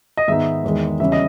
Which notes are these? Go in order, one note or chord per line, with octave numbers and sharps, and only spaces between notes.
D#5
G#2 D#3 G#3 B3 D#4 E5
E2 D#3 G#3
E2 C#3 G3 C#4 E5
D#5